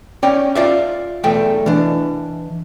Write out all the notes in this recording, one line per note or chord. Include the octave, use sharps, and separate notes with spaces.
C#4 D5 G5
F4 D5 E5
B1 E2 A3 G5
E3 D4